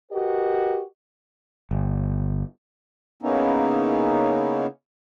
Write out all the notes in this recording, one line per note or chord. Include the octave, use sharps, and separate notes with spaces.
F#4 G4 A#4 B4 D#5
G1
C#3 A#3 B3 C#4 D#4 E4